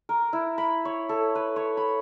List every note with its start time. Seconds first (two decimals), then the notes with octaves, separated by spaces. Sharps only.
0.09 A#4
0.33 E4
0.58 B5
0.85 C#5
1.09 A4
1.35 B4
1.56 C#5
1.77 B5